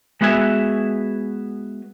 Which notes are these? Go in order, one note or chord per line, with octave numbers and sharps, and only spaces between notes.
G#3 B3 F#4 E5 F#5 G#5